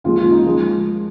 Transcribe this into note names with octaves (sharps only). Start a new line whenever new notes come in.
D#2 C#3 F3 G#3 F4
F4
D#4
F3 G#3